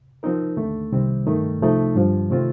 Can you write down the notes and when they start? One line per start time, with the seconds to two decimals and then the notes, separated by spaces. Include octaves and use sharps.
0.23 F3 C4 D#4 A#4
0.57 D#2 D3 A3
0.92 C2 C3 D#3 G3 C4
1.27 G2 D#3 A3 D#4
1.61 C2 C3 F3 A3 D#4
1.96 G2 D3 F3
2.30 C3 D#3 A3 C4 F4